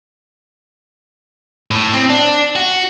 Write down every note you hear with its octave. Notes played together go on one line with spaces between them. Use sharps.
A2
C4
D4
F#4